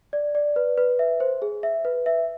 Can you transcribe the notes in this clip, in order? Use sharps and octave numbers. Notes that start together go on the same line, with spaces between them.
D5
D5
B4
B4
E5
C5
G#4
E5
B4
E5